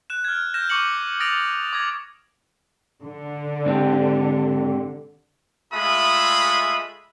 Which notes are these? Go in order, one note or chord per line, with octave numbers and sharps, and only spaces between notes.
F#6 E7
F6 G#6
F6 G6 A#6 E7
C#6 D6 F6 C#7 F#7
D#6 A6 A#6 D7 F7
D6 D#6 G#6 A#6
D3
G#2 C4 G4
G#3 A3 F4 E5 B5 D#6